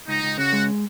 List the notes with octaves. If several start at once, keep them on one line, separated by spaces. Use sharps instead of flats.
C#2 D#4
C#2
C#3 F#4
G#3